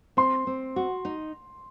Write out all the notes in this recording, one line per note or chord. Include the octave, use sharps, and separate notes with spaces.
C4 C6
C4
F#4
D#4